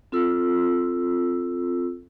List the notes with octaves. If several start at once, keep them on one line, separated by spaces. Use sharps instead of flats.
C4 F4 A4 E6